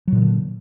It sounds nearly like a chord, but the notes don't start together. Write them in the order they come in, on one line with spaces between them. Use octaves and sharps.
F#3 A#2 D#3 D3